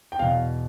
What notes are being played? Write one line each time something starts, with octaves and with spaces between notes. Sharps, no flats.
G5
E2 B2 F5